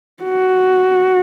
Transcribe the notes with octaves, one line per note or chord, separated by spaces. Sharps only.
F#4